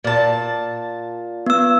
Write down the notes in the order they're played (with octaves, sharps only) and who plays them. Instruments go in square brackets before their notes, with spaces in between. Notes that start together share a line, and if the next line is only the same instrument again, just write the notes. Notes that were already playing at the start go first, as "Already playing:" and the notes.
[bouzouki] A#2 A5
[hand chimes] B3 E6